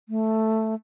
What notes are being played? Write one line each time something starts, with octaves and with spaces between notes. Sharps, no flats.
A3